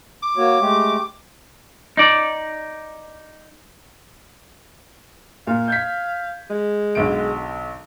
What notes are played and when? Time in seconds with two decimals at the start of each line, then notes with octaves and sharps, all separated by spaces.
0.23 D6
0.37 A#3 F#4 C#5
0.61 G#3 A3 G4
1.97 D#4 D5
5.47 A#2 F5
5.68 G6 G#6 B6
6.50 G#3
6.95 B1 D3 D7